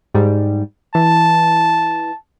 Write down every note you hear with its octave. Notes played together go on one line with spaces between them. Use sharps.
G#2 G3
E3 A5